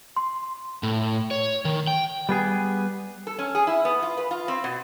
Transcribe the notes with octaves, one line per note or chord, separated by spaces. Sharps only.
C6
A2
C#5
D#3
G5
G3 B3 G#4
A4
C#4
G#4
E4
B3
F4
B4
F4
C4
B2